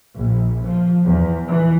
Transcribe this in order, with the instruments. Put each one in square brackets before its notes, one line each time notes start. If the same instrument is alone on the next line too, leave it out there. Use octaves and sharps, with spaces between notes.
[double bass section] A#1
F3
E2
E3